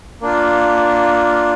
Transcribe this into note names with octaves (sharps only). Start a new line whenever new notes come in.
A#3 D4 F4